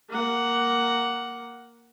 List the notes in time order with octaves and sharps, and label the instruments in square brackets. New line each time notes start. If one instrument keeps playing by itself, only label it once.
[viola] A#3 F#5